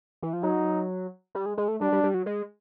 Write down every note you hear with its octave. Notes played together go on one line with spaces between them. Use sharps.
E3
F3
F#3 D#4
G3
G#3
G#3
A3
G3 D4
G3
G3
F#3
G#3